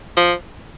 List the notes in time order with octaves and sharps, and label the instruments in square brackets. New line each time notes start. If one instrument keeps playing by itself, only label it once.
[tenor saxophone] F3